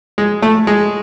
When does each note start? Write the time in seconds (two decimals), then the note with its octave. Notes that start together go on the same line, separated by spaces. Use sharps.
0.18 G#3
0.42 A3
0.67 G#3